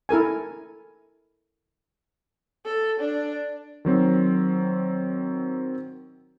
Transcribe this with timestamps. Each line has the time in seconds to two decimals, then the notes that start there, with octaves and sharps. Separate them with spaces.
0.09 E4 A4 A#4 G#5
2.65 A4
3.00 D4
3.85 D#3 F#3 C4